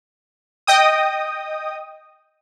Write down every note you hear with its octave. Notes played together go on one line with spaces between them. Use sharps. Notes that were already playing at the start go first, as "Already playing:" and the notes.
D#5 G5 D#6